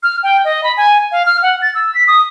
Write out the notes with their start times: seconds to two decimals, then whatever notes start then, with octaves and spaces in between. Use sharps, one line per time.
0.03 F6
0.23 G5
0.44 D#5
0.63 B5
0.77 G#5
1.12 F5
1.26 F6
1.42 F#5
1.62 A6
1.75 E6
1.94 B6
2.07 D#6